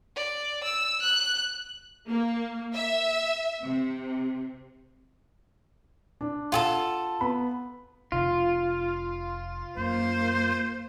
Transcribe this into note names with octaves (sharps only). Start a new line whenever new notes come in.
D5
E6
F#6
A#3
E5
C3
D4
F4 G#4 A4 F#5 A5
B3 B5
F1 F4
F#2 A#3 C5